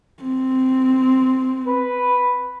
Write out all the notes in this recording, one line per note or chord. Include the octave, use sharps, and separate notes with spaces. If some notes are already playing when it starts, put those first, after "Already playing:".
C4
B4